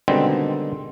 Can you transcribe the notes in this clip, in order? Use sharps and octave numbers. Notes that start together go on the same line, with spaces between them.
B2 D3 D#3 G3 G#3 C4